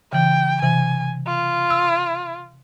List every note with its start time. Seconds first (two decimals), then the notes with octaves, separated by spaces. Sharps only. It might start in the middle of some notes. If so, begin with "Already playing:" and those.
0.13 C#3 E3 G5
0.62 C3 E3 G#5
1.27 F4
1.70 E6